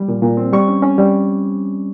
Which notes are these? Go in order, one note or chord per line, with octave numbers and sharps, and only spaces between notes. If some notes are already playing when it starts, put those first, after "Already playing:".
Already playing: G3
A#2
A#2
C4
G3 C#6
C#4
C#4
G3